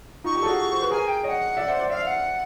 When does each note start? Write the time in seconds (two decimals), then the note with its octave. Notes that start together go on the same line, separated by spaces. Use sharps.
0.24 D#4 F4 C#6
0.35 F4 G4
0.42 A4
0.46 F#4 G#4
0.72 C5
0.82 B4
0.91 G#4 A#4 G#5
1.07 G5
1.23 C#5 D#5 F#5 G5
1.57 D5 E5
1.67 C5 D5
1.79 C5 D5
1.90 D5 E5 F5
2.06 F#5